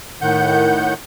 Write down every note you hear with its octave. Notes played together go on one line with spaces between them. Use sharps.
A2 D#3 F#5 G6